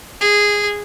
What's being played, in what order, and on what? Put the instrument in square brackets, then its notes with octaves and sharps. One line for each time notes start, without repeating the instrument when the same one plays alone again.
[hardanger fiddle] G#4